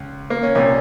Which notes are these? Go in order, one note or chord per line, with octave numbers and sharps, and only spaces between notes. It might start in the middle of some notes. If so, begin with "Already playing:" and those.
Already playing: C#2
A#3
C#4
C2 A#2 C#4